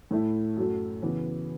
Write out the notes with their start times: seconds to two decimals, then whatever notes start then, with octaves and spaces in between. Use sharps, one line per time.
0.11 A2 A3 E4
0.57 F#2 F#3 A3
1.02 C#3 E3 B3